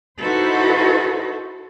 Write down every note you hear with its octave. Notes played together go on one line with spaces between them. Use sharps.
D#4 E4 F#4 A4 B4 C5